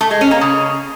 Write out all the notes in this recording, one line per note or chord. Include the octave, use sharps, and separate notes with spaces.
A3
G#3
C#4
A#3
C#3